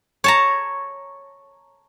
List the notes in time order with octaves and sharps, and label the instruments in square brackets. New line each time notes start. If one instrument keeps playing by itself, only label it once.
[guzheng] C#5 A5 A#5